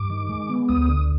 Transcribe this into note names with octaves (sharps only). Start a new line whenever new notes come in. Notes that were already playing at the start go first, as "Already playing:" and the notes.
Already playing: G2 D6
D#3
G#3
B3
D2 D#6
D3